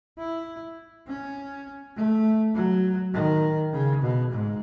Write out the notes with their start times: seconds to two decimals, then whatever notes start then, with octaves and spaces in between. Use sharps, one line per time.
0.18 E4
1.07 C#4
1.96 A3
2.54 F#3
3.14 D#3
3.73 C#3
4.02 B2
4.31 G#2